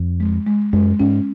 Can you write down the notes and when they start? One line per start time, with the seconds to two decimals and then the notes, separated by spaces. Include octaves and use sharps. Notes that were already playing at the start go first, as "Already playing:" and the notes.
Already playing: F2
0.20 G#3
0.46 G#3
0.73 F#2 G#3
1.00 G#2 C#4